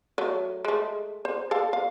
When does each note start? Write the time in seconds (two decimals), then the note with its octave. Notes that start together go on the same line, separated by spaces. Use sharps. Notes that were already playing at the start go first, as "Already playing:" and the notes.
0.18 F#3 A3
0.65 G#3 A3
1.25 C5
1.51 A4 F5 A5
1.73 F5